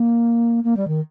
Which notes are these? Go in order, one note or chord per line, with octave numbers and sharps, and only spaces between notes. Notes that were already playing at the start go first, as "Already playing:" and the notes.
Already playing: A#3
A#3
G3
D#3